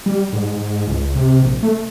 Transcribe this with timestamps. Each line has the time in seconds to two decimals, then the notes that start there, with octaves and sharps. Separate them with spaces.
0.06 G3
0.33 G#2
0.57 G#2
0.87 C#2
1.15 C3
1.42 A#1
1.63 A3